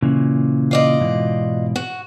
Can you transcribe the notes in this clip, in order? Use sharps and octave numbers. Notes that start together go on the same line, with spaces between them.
A#2 C#3 E3
F4 D5 D#5
G#2 B2 E3
F#4